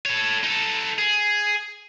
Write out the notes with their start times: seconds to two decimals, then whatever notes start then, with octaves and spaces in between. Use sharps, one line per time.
0.06 A4 C#5
0.44 D#4 A4
0.98 G#4